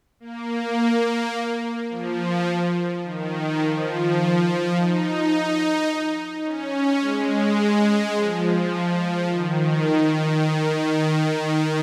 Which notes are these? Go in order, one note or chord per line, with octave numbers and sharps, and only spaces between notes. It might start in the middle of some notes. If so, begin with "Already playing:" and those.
A#3
F3
D#3
F3
D#4
D#4
C#4
G#3
F3
D#3
D#3